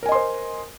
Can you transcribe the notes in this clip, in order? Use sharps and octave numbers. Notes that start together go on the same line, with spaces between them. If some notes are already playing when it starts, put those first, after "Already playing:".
A#4 C5 D#5 G#5 C6